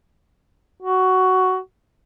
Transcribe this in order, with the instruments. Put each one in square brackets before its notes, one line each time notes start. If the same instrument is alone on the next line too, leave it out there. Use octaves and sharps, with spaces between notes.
[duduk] F#4